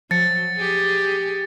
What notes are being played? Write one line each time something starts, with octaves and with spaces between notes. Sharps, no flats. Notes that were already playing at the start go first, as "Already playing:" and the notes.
F3 F#3 A6 C#7
G4 G#4